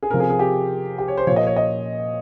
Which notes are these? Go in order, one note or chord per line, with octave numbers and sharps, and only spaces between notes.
G#4
C3 F3 A#4
G#4
G#4
G4
G4
C#5
C5
A#2 F3 C#5
D#5
C#5
D#5